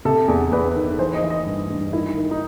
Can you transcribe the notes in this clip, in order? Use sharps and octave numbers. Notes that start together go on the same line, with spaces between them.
C3 A4
E2
E2 B4
D#3
E3 C5
D#5
E3
D#5
G2
G2
D#3 E4
D#3
D#4